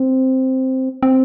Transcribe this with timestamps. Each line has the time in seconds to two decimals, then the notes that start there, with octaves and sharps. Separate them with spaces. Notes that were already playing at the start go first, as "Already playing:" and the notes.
Already playing: C4
1.03 C4